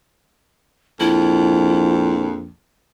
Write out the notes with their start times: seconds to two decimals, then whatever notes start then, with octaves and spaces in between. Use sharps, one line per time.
1.00 A#1 F2 E4